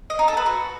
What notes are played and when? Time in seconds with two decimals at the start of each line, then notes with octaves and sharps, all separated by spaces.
0.10 D#5
0.19 D#4
0.28 A4
0.37 B4
0.46 F#4